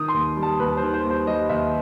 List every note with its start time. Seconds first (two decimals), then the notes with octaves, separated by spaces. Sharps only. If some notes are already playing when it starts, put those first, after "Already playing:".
Already playing: D#3 D#6
0.08 C6
0.14 D#2
0.37 G3
0.43 A5
0.59 D#2 B4
0.77 C5
0.82 D#3
0.93 C5
1.04 D#2
1.10 C5
1.27 G3 D#5
1.49 D#2 E5